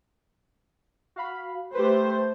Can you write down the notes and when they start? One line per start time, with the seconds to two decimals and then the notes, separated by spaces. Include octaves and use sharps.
1.16 F#4 F5 B5
1.75 A3 G4 B4 C5